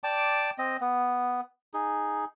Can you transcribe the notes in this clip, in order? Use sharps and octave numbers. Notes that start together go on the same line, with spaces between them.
D5 G5 A5 D6
C4 D#5
B3
D#4 G#4